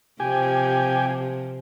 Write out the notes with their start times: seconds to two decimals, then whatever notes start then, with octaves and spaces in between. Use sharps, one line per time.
0.20 C3 F3 C4 G4 G#5